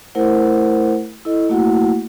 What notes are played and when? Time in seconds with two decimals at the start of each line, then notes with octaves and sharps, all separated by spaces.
0.15 A3 E4 A#4 C5 F#5
1.25 E4 A4 D#5
1.49 A3 A#3 E4 F#4 F#5